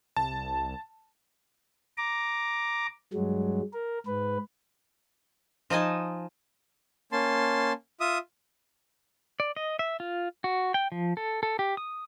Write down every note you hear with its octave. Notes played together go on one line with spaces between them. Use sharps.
C2 A5
A#5 D6
G2 F#3 G#3
A#4
G#2 B4
F3 D#4 D#5 G#5 A5
A#3 C#4 A5 C6
F4 E5 D#6
D5
D#5
E5
F4
F#4
G5
F3
A4
A4
G4
D#6